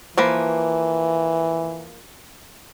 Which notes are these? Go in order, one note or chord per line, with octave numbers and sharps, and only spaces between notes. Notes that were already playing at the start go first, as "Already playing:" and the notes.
E3 F3 A#3 B4